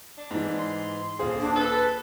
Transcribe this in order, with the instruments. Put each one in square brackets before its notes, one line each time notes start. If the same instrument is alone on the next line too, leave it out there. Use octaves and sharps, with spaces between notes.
[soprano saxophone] D4
[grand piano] G#2 E3
[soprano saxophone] C6
[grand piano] D#1 F4 G#4 [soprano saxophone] C4
[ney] D4
[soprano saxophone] A4 [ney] B4